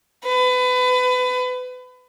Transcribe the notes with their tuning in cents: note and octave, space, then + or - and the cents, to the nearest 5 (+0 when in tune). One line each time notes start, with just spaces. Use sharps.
B4 +25